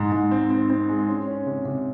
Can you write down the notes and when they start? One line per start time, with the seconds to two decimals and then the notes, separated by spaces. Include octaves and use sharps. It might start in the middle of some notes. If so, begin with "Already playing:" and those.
Already playing: G#2
0.12 G#2
0.31 C4
0.50 C4
0.70 C4
0.89 G#3
1.08 C#4
1.27 C#4
1.47 C3
1.65 C3